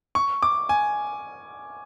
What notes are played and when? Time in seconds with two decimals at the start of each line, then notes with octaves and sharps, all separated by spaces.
0.15 C#6
0.43 D6
0.69 G#5